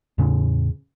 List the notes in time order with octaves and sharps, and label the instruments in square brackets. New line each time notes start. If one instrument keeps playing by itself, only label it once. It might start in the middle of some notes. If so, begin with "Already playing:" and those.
[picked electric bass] E2 A2 C#3 C#4